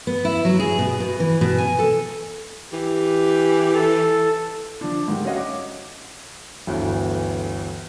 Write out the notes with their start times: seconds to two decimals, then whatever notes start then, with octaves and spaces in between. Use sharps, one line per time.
0.07 B3
0.25 E4
0.45 F#3
0.59 G#4
0.79 B2
1.00 B2
1.20 E3
1.41 B2
1.58 G#5
1.79 A4
2.73 E3 G4
3.75 A4
4.81 F3 D4
5.08 G#2 D#3 G3
5.25 C#4 F#4 C#5 D#5 F5 F#5
5.38 D6
6.67 G1 D2 E3